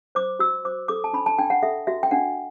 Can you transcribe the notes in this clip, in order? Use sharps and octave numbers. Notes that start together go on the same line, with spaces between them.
C5 D6
F#4 E6
C5 D6
A4 D6
A5
D4 B5
A5
D4 G5
F#5
A4 E5
F#4 E5
G5
D4 F#5